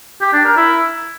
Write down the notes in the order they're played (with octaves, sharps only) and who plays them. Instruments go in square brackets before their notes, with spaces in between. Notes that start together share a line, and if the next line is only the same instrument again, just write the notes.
[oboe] G4
D4
A#4
E4